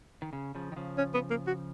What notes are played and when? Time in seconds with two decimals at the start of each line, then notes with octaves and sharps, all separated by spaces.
0.22 D#3
0.33 C#3
0.55 C#3 F3
0.72 D#3
0.76 C#3 F3
0.98 C#4
1.14 B3
1.30 A#3
1.47 F#4